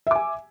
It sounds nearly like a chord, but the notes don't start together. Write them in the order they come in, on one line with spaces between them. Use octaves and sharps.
E5 D6 G#5